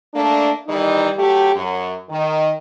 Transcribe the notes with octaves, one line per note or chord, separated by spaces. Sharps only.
A3 A#3 D4
D#3 E3 G3 D#4
F#3 A3 G4
F#2
D#3